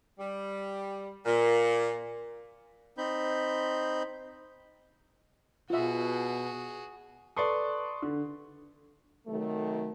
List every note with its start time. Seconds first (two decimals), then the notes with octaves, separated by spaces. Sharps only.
0.18 G3
1.26 A#2
2.98 C4 D#4 B5 G6
5.70 B2 F4 F#4 G#4 E5
7.37 A4 B4 D5 C6 C#6 D#6
8.02 D3
9.27 C3 D#3 F#3 A3